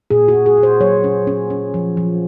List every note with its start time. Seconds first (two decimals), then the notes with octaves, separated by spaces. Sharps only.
0.10 A#2 G#4
0.28 F#4
0.34 A#2
0.46 G#4
0.58 A#2
0.63 C5
0.81 F#3 C#5
1.04 C#4
1.27 C#4
1.50 C#4
1.74 F3
1.97 F3